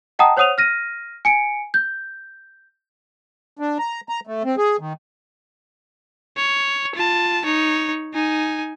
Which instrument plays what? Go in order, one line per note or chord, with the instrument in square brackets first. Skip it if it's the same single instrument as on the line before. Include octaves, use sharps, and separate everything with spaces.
[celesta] D#5 F#5 G5 A5 A#5 D#6
C5 C#5 F#5 D#6 D#7 F7
F6 A#6 D#7
G#5 C#7 D7
G6
[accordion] D4
A#5
A#5
A3
C4
G#4
D#3
[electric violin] C#5
F4 A5
D#4 C#5
D#4 G#5